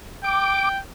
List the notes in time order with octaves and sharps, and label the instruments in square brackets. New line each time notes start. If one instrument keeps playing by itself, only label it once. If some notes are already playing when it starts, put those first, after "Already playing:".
[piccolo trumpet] G5 [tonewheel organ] D6